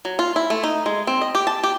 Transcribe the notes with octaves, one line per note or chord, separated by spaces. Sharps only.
F#3
F4
E4
A3
D#4
G#3
C4
D#5
G4
A5
G4